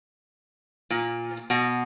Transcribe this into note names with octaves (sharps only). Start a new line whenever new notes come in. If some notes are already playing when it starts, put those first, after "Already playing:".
A#2
B2